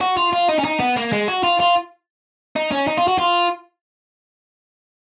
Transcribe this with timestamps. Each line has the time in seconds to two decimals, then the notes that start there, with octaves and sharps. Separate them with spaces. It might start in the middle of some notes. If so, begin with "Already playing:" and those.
0.01 F#4
0.17 F4
0.33 F4
0.49 D#4
0.59 C#4
0.65 D#4
0.80 B3
0.97 A#3
1.12 G#3
1.28 F#4
1.43 F4
1.60 F4
2.56 D#4
2.71 C#4
2.87 D#4
2.97 F4
3.08 F#4
3.18 F4